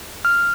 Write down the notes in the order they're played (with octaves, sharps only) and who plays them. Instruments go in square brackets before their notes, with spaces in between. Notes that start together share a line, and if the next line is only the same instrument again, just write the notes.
[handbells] F6